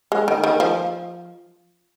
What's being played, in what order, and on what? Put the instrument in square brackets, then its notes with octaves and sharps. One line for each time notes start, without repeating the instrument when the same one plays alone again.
[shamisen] G#3
D#3
D#3
F3